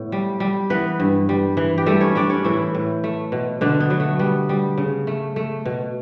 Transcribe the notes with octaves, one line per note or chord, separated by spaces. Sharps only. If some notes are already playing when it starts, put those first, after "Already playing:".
Already playing: A2 B3
G3
G3
E3 B3 B4
G2
G3
E3
G4
G3 A3 A4
C#4 C#5
G3 D4 D5
C#4 C#5
A2 E3 E4
A2
A3
B2
B2 D3 D4
B3
F#3
A3
G3 B3
G3
C#3
A3
A3
B2